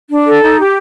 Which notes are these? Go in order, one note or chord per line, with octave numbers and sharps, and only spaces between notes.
D4
A4
D#4
G4